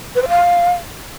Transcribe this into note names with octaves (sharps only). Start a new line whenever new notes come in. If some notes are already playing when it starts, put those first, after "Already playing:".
B4
C5
F5